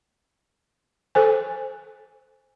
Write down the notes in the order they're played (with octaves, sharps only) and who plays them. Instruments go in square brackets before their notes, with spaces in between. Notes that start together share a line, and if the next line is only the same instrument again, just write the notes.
[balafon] A4 C5 G#5